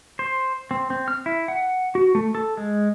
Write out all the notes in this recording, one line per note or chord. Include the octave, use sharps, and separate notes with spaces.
C5
C4
C4
F6
E4
F#5
F#4
A3
A4
G#3